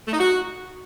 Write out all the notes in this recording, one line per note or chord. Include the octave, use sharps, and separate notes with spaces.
A3
D#4
F#4